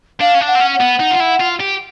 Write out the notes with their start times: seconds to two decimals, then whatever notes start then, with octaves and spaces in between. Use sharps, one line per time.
0.21 D4 F5
0.35 C#4
0.41 D4
0.48 F#5
0.56 C4
0.60 C#4
0.74 F#5
0.81 B3
1.00 D#4
1.11 F4
1.20 E4
1.41 F4
1.60 G4